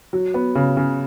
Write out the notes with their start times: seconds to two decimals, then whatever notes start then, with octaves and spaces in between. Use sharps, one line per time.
0.13 F#3
0.34 B3
0.55 C#3
0.77 C#3